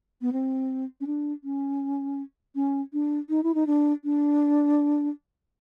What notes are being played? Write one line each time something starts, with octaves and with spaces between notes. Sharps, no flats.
B3
C4
C#4
D4
C#4
C#4
D4
D#4
E4
D#4
D4
D4